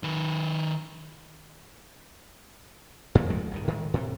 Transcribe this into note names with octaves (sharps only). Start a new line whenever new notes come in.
D#3 B4
F#2 A#2 D3 F#3
F3 G#3 A3
A#1 G2 D#3
A2 D#3 E3 G#3
A2 C3